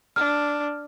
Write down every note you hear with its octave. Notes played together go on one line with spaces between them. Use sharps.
D4 F6